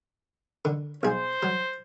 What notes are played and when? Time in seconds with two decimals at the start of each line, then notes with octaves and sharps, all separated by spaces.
0.65 D3
1.03 B1 G#4 C5
1.43 F#3